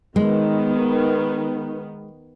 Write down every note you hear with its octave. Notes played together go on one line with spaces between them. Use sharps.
D#3 G#3 B3